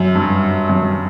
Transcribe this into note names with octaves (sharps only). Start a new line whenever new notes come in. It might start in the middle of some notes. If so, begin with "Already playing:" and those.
Already playing: F#2
G2
F#2